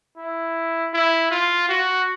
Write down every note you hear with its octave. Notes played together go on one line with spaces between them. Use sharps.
E4
E4
F4
F#4